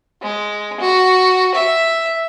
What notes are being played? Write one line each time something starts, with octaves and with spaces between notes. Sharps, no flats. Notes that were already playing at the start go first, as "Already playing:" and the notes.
G#3
F#4
E5